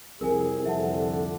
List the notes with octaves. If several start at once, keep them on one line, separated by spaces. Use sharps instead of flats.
C2 F2 G#4 A#4 G#5
F2 D3 E5 F#5 A5